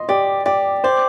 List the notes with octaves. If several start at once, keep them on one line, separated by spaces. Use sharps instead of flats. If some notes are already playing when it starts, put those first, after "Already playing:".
Already playing: D#5 C6
G4 D5
G4 D5
C5 D5